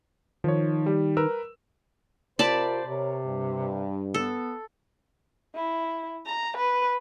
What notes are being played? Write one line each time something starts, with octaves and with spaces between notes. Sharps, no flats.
D#3 F3 C#5
G3 G4
A#4 B4 E6
C3 F4 A#4 C5 D5 A5 B5
C3 A#4 C#5
G2
B3 A4
E4
A#5
B4